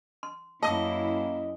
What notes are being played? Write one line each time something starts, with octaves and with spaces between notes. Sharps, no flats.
C6
F#2 A#3 E4 D#5 A5 D#6